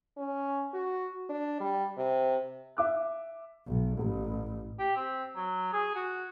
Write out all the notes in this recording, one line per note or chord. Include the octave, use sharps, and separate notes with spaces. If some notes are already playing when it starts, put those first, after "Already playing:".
C#4
F#4
D4
G3
C3
E5 D6 F#6
B1
A1
G4
C4
F#3
G#4
F#4